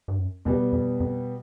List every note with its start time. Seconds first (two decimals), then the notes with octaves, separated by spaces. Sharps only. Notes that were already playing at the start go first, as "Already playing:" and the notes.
0.08 G2
0.18 F#2
0.45 E2 B2 G3 B3
0.72 F2
1.00 F2